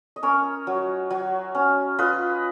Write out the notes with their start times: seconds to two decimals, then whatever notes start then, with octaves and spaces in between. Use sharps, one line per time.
0.16 D#5
0.23 C#4 A#4 C#5
0.67 F#3
1.10 F#3
1.55 C#4
1.99 F4 B4 D#5